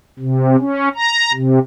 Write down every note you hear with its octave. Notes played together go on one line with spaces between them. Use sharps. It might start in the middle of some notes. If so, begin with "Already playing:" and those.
C3
C#4
A#5
C3